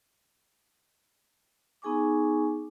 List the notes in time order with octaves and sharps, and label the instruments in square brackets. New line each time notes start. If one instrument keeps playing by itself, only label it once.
[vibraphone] B3 D#4 G#4 G#5 C#6 D6